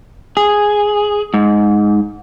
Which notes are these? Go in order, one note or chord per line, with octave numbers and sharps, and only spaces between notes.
G#4
G#2